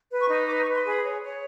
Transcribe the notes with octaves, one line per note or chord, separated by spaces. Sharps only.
B4
C#6
D#4
B4 D6
C#6
B4
C6
G#4 B5
C#5
C#5